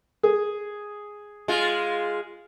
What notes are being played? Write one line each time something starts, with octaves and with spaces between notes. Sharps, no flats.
G#4
G#3 F4